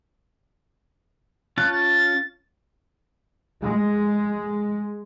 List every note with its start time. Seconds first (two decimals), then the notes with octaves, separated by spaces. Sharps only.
1.58 C#4 F4 A5 F#6
1.72 A6
3.62 G#3